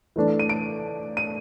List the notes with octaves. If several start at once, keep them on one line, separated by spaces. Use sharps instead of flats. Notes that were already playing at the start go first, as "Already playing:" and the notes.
E3 A3 D4
D#7
D7
D#7